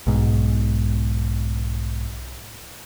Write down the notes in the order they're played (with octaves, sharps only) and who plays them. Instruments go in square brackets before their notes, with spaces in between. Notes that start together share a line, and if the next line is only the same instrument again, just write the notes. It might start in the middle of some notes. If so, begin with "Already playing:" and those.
[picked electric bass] B1 G#2